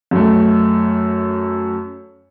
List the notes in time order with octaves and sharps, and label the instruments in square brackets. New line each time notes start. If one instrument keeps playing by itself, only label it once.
[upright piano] F#2 A3